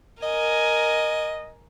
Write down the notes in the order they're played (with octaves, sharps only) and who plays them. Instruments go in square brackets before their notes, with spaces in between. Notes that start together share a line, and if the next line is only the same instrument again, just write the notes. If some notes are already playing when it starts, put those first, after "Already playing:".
[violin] A#4 G#5 [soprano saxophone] D#5